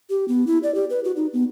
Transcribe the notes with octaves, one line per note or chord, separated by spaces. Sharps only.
G4
B3
E4
D5
G4
B4
F#4
D#4
B3